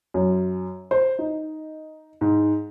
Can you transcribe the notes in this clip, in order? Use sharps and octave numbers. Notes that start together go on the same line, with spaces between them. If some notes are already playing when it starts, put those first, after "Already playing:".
F#2
C5
D#4
G#2